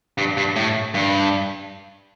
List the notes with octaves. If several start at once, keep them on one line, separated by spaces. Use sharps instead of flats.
G2
G2
A2
G2